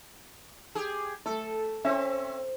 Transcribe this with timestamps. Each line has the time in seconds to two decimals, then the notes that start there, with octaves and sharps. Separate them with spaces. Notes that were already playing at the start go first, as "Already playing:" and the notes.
0.75 G4 G#4
1.26 A3 A4
1.85 C4 C#4 E5